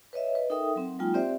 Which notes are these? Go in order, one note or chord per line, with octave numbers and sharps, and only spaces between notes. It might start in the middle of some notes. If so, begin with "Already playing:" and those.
B4 C#5 D#5 E5
B4 D#5
D#4 A4 A#4 E5 G5 D#6
F#3 C4
F#3 G#3 A#3 D#4 F4 G5
C4 G4 C5 D5 E5